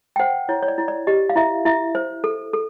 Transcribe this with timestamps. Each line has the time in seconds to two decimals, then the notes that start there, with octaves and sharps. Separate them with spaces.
0.16 G5
0.19 C5 F#5
0.49 E4 C#5
0.63 C#5
0.68 D5
0.78 E4
0.88 D5
1.07 G4 D#5
1.29 F5
1.36 E4 E5
1.65 E4 E5
1.95 C5
2.24 A4
2.53 A4